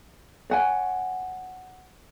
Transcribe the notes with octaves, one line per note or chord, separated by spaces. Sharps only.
C#5 F#5 G#5